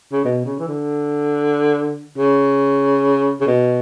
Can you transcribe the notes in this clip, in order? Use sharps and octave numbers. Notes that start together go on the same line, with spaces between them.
C#3
B2
C#3
E3
D3
C#3
C#3
B2